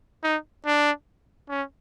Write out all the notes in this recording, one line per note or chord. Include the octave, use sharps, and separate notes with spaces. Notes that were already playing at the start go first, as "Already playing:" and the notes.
D#4
D4
C#4